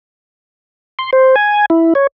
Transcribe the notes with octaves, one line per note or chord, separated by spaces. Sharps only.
C6
C5
G#5
E4
C#5